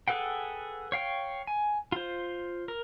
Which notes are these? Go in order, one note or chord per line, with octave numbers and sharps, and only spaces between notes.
G#4 A4 B4 F#5 G5
C#5 F5 G5
G#5
F4 C5
A#4